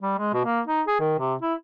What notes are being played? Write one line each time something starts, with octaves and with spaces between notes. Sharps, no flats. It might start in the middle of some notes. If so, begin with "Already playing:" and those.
G3
G#3
B2
A#3
D#4
G#4
D#3
C3
E4